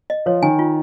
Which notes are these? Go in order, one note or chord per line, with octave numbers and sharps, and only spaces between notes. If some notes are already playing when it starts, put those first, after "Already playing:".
D#5
F3 C#5
D#3 G#5
F4